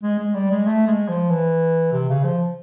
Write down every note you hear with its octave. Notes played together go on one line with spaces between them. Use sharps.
G#3
G#3
G3
G#3
A3
G#3
F3
E3
C3
C#3
F3